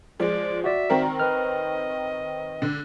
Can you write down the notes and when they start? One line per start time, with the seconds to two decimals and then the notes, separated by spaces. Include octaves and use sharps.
0.20 F3 G#3 D5
0.64 F#4 D5 E5
0.89 D#3 C4 A#4
1.20 B4 D#5 F6
2.62 D3